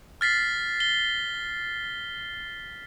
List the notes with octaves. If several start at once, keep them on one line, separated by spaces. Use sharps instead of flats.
F6 A6 B6 C7
G7